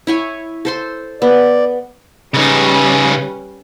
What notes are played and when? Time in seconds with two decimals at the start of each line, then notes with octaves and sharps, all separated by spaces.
0.07 E4 C#5 G#5
0.65 A4 C5 C6
1.22 B3 D5
2.34 C#3 G3 C#4 D#4 B4